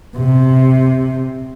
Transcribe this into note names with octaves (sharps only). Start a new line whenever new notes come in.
C3